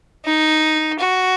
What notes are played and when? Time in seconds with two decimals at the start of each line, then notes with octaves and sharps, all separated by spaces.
0.25 D#4
1.00 F#4